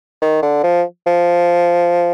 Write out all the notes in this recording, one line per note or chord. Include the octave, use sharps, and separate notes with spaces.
D#3
D3
F3
F3